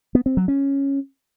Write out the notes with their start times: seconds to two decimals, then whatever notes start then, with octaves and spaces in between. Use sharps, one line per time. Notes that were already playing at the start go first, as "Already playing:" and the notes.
0.15 B3
0.26 C4
0.37 F#3
0.48 C#4